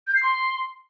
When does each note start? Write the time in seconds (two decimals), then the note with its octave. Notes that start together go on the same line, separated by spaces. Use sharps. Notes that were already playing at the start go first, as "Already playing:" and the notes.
0.07 G6
0.15 C7
0.23 C6